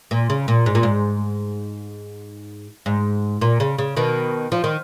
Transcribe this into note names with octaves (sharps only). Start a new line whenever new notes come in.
A#2
C#3
A#2
G#2
A#2
G#2
G#2
A#2
C#3
C#3
B2 D#3
F3
D#3